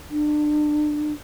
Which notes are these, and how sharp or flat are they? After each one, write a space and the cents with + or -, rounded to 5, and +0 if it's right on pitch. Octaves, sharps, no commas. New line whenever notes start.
D4 +30